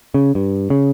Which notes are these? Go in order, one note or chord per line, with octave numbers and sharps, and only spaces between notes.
C#3
G2
C#3